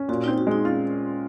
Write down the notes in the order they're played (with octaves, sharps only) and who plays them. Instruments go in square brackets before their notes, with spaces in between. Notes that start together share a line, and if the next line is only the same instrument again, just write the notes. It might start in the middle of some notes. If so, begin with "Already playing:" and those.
Already playing: [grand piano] C#4
[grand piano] A#2 [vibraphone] F#4
[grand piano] C4 [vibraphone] D#4
[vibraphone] F#4
[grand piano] G#3 [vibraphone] D#4
[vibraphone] C#4 [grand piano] F4